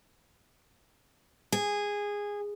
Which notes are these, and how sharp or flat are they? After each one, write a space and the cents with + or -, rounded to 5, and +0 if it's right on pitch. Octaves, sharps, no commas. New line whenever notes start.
G#4 -15